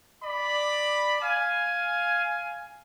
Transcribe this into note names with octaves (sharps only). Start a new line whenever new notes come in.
D5 B5
F5 G#5